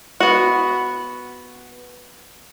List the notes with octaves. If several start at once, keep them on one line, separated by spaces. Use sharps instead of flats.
B3 F#4